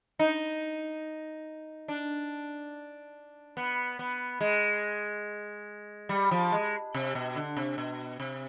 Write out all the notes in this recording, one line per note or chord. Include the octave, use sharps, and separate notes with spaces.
D#4
D4
B3
B3
G#3
G3
F3
G#3
C3
B2
D3
C3
B2
C3